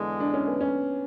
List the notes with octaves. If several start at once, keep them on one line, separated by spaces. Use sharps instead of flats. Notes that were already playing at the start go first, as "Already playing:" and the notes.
Already playing: E2 D3 G#3
D4
C#4
B3
C#4